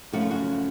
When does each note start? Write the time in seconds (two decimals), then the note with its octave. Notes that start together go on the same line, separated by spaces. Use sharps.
0.12 F#2 C#3 F3 A3 C#4 F#4
0.21 F4
0.31 F#4